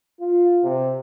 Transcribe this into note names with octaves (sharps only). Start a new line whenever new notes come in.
F4
C3